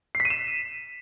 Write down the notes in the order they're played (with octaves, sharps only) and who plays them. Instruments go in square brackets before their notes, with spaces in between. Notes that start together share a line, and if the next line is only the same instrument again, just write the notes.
[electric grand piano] C7
B6
D#7
E7